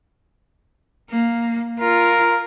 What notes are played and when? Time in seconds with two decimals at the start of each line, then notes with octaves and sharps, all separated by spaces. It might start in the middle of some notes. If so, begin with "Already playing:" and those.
1.10 A#3
1.80 F4 A#4